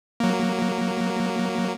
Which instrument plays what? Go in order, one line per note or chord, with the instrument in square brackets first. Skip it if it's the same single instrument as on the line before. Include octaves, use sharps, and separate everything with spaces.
[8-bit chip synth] F#3 A#3